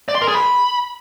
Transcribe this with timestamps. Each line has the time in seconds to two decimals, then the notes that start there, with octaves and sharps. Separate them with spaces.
0.08 D5
0.15 C6
0.22 A#4
0.28 G#4
0.35 B5